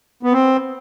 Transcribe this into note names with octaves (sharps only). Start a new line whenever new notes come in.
B3
C4